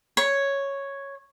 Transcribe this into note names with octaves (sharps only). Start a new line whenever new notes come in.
C#5